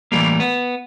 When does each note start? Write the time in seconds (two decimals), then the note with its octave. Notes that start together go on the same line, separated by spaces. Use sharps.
0.12 A2 E3 F3 G3 A#3
0.40 B3